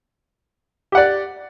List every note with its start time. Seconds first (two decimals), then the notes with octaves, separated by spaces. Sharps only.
0.92 G4
0.95 F#5
0.97 D5